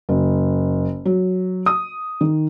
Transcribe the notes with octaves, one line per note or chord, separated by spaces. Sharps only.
F#1
F#3
D#6
D#3